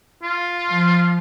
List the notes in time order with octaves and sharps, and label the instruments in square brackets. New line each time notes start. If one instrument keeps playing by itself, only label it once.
[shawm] F4
[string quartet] F3